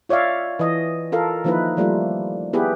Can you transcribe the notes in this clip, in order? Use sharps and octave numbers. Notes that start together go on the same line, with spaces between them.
F4 C#5 D5 E5 F5
E3 D#5
F4 A4 A#4 F5
D#3 F3 A#3 D#4 E4 B4
F3 G3 A3 A#3 F4
B3 E4 G4 G#4 B4